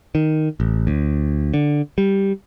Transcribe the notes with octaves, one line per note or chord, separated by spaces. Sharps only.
D#3
A1
D2
D3
G3